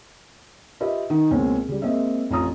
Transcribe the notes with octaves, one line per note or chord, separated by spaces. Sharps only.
F4 G4 B4 D#5 E5
D#3
C#2 B2 A#3 C4 C#4
C#3 G3
G#3 A#3 C4 D#5 E5
A1 F2 C#4 F4 A#5 D#6